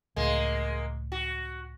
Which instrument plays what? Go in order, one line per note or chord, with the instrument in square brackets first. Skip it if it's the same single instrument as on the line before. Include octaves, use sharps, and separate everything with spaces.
[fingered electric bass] C#2 A2 [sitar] G#3 A#3
[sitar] F#4